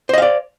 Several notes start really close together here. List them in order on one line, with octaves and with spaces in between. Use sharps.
C5 D#5 F5 D5